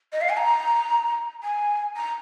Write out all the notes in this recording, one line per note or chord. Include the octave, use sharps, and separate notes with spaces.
D#5
F5
G#5
A#5
G#5
A#5